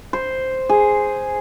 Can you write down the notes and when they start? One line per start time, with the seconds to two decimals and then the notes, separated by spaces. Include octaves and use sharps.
0.13 C5
0.69 G#4